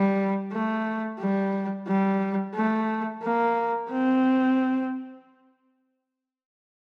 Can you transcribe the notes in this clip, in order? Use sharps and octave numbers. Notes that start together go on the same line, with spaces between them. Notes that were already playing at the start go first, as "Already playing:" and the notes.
Already playing: G3
A3
G3
G3
A3
A#3
C4